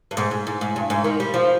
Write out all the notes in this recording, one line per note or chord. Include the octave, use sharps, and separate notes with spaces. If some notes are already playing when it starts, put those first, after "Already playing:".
G2
G#2
G#2
G#2
G#2
G2
G#2
D#3
G3
F3